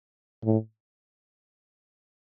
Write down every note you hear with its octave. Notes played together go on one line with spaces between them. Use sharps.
A2